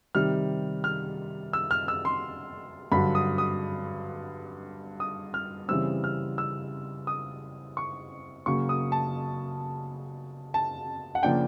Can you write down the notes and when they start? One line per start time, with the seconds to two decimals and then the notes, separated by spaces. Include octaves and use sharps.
0.15 C3 D#3 G3 F6
0.84 F6
1.53 E6
1.71 F6
1.88 E6
2.05 C6
2.92 G2 D3 F#3 B5
3.15 D#6
3.38 D#6
5.00 D#6
5.34 F6
5.68 C#3 E3 G3 C4 E6
6.04 F6
6.38 E6
7.07 D#6
7.77 C#6
8.46 C#3 F#3 A#3 C#6
8.69 D#6
8.92 A5
10.54 A5
11.15 F#5
11.23 C#3 F3 A#3 D4 G5